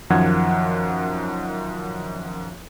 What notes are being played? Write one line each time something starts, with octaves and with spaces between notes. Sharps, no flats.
F#2 D#3 F3 F#5 G#6